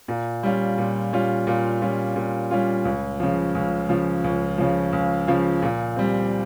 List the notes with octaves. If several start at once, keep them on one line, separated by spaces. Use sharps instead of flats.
A#2
G3 C#4 F4
A#2
G3 C#4 F4
A#2
G3 C#4 F4
A#2
G3 C#4 F4
C#2
C#3 F3
C#2
C#3 F3
C#2
C#3 F3
C#2
C#3 F3
A#2
G3 C4